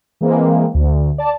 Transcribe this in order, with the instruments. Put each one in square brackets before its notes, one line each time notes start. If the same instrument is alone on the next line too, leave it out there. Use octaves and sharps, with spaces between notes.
[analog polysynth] E3 G#3 A#3 C4
D2
D5 A5